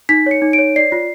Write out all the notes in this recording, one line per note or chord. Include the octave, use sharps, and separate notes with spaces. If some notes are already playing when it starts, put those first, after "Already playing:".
D#4 B6
C#5 C#7
D#4
D7
C#5
D5 C7
F4